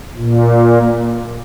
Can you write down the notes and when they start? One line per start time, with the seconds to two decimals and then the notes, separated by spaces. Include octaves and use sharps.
0.17 A#2